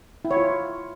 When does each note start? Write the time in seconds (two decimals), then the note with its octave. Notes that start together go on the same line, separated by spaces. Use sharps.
0.25 E4
0.31 C#5
0.37 F4